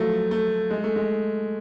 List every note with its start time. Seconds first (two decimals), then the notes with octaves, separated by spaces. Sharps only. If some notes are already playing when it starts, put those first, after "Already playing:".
Already playing: F3 F#3 A3
0.31 A3
0.71 G#3
0.84 A3
0.96 G#3